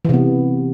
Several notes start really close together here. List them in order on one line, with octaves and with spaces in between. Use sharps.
E3 C3 B3